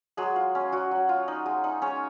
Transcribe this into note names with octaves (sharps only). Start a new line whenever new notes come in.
F#3 G#3 G#4
F4
C#4
F#3 F#4
F#3
F4
D#4
G#3
D#4
G#3 C#4 C#5